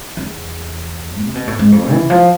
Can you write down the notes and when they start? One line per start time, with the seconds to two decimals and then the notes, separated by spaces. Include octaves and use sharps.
0.17 E2
1.22 C3
1.35 B2
1.47 A2
1.59 G#2
1.72 F2
1.91 E3
2.10 F3